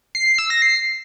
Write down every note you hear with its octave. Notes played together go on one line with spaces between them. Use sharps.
C7
C7
E6
A#6
C7